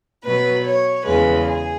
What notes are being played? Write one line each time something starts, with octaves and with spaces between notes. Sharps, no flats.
B2 F#3 B4
C#5
E2 C#3 G#3 B4
G#4